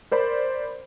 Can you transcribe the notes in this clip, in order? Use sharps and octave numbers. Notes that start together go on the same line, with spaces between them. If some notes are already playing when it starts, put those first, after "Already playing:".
A#4 C5 D5 B5